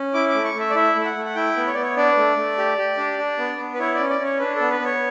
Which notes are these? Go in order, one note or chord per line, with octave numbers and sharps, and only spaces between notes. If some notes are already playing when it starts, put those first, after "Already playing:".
Already playing: C#4
E4 D6
D6
A3
C#6
A3
E5
D5
E4 E5
A3
E5
F#5
A3
F#5
E4 G5
B3
C#5
B3 D5
C#5
D4 D5
A3
A3
G4
G4
D4
D4
B3
B3
B4
E4 C#5
D5
C#4
D5
C#4 C#5
D4 B4
A4
B3
B4
B3
C#5